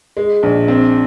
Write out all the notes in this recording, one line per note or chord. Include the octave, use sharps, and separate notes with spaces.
G#3
A#1
C4